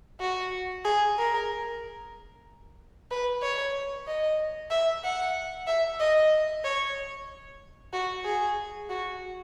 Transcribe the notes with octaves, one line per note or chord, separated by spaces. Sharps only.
F#4
G#4
A#4
B4
C#5
D#5
E5
F#5
E5
D#5
C#5
F#4
G#4
F#4